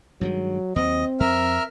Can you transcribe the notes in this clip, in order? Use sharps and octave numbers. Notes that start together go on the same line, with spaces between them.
G2 D#3 F#3 G#3
D#2 F#3 C4 D#5
F2 A#4 E5 F6